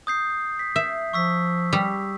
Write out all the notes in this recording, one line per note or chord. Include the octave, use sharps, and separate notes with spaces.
D#6 G6 C7
B6
E5
F3 C#6 E6 B6
G3